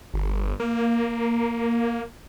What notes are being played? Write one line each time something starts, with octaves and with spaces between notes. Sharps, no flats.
G1
A#3